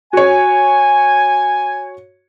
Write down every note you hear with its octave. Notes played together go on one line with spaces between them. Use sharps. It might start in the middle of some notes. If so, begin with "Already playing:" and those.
F#4 C#5 G#5